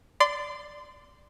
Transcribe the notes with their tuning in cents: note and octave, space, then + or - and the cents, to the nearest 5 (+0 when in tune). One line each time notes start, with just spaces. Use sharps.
D5 +0 C6 -25